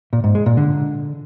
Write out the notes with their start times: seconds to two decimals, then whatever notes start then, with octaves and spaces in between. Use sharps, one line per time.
0.13 A#2
0.24 G#2
0.35 G#3
0.46 A#2
0.57 D3